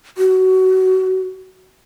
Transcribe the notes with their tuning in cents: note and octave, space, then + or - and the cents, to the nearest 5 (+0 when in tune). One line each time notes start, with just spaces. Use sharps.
F#4 +20